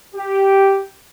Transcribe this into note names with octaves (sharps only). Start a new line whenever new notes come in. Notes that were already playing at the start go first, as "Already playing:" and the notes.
G4